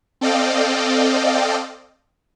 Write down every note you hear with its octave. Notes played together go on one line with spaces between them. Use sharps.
C4 A4 D5 D#5 F5 G5